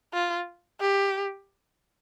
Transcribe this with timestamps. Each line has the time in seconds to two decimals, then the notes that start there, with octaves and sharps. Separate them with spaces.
0.14 F4
0.81 G4